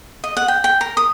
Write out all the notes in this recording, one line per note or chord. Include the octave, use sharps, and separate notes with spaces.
D#5
F#5
G5
G5
A#4
D#6